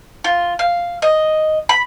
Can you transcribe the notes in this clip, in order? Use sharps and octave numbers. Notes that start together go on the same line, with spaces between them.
F4
F5
D#5
B5